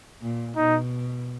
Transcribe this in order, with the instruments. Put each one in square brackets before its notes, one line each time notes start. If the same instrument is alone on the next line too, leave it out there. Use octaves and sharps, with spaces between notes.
[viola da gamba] A#2
[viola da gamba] B2 [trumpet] D#4